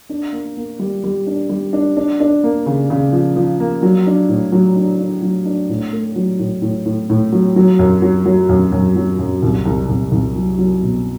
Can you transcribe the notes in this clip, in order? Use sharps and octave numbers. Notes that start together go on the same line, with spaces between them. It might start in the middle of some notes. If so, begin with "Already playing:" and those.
D4
A#3
A#3
G3
G3
D4
G3
D4
D4
D4
A#3
C#3
C#3
F3
F3
A#3
F#3
D4
A2
F#3
D4
D4
F#3
D4
A2
A3
F#3
A2
A2
A2
A2
F#3
F#3
F#2
F#3
F#3
F#2
F#2
F#3
F#2
C2
C2
C2
C2
F#3
F#3
B2